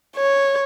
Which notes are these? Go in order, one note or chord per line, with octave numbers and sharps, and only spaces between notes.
C#5